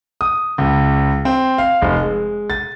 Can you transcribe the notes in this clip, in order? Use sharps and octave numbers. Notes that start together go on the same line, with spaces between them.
D#6
C#2
C4
F5
F1
G#3
A6